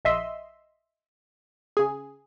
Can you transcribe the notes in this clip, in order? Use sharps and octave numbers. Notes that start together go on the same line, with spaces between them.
A#1 D#5 E5 C6
C#3 G#4